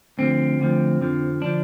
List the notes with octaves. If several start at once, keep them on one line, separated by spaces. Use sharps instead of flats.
D2 D3 F3 C4
D2 D3 F3
F2 D3 F3
D3 F3 D4